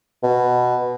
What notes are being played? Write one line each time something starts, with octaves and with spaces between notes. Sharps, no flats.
B2